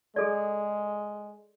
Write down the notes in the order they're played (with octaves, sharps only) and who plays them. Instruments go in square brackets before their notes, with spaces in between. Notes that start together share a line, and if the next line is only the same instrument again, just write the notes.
[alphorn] G#3 [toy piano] G#4 A4 D5